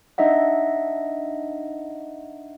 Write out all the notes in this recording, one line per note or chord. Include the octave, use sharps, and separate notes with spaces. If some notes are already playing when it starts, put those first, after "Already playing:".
D4 D#4 D#5 E5 F#5